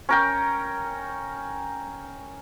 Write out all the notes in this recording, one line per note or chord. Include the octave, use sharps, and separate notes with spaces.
C#4 A#4 G5